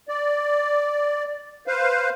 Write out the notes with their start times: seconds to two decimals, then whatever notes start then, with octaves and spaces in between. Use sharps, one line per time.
0.08 D5
1.67 B4 C5 F5